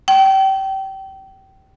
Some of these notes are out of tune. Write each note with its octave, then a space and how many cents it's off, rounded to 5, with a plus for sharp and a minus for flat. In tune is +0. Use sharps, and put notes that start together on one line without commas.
G5 -25